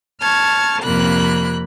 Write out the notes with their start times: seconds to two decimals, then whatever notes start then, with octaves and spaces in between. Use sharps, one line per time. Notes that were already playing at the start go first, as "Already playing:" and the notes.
0.21 A5 C#6 F6 G#6
0.82 F2 C3 A#3 B5 F#6